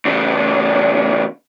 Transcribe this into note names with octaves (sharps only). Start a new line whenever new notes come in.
E2 C#3